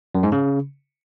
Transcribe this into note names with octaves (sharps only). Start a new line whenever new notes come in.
F#2
G#2
C#3